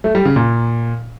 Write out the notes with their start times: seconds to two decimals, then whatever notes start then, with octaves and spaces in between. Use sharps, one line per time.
0.04 A3
0.15 G3
0.25 C#3
0.36 A#2